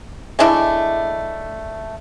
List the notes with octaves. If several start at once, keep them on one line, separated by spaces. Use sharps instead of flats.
G#3 A3 D4 E4